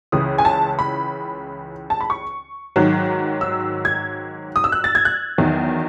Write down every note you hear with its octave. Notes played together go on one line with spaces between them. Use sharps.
C#2 C#3 E3 D#6
G#5
A5
B5
A5
B5
C#6
G#2 D#3 F#3
E6
G#6
D#6
E6
F#6
A6
G#6
F#6
E2 D#3 F#3